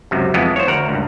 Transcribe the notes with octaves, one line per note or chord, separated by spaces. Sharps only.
C#2 F#2 C3
F2 E3 G#3 B3
C5 C#5
D2 A#4 F#5 A#5
C#2 G2